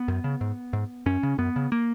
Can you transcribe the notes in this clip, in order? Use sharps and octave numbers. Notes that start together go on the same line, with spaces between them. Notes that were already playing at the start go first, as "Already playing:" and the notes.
Already playing: B3
F#2
C#3
G#2
G#2
F#2 C#4
C#3
F#2 B3
C#3
A#3